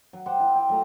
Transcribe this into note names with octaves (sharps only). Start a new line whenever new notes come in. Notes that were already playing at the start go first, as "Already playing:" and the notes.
F#3
G4 C5 F#5
E4
G5
F#3 A3 A#5